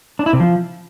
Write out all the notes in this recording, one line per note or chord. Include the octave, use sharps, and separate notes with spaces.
D4
E4
C3
F3